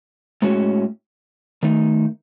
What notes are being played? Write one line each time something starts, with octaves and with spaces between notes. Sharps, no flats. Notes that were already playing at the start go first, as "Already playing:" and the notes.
A2 G#3 C#4 F#4
D#3 A3 D#4